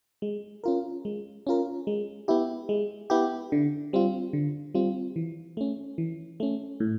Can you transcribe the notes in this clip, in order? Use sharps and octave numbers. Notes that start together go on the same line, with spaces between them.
G#3
C#4 F4 A#4
G#3
C#4 F4 A#4
G#3
B3 E4 G4
G#3
B3 E4 G4
D3
G3 C4 F4
D3
G3 C4 F4
E3
A3 C#4
E3
A3 C#4
A2